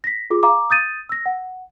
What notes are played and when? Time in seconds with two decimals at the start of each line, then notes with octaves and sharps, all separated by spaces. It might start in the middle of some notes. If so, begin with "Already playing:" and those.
0.04 A#6 B6
0.30 F4 G#4 D6
0.43 F5 A#5 D6
0.70 D#6 G6 A6 D#7
1.09 E6 A#6
1.26 F#5